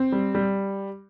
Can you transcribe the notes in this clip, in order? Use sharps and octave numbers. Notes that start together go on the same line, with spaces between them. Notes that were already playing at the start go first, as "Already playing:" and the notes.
Already playing: C4
G3
G3